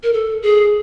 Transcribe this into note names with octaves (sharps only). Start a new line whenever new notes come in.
A#4
A4
G#4